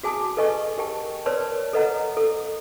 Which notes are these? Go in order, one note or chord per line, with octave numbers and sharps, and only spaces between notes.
F#4 G#4 G#5 A5 D#6
A4 B4 D#5 G#5 C#6
G4 A#4 G5 A5
A#4 B4 C#5 D5 A5 C6
A4 B4 D#5 F#5 A#5
A4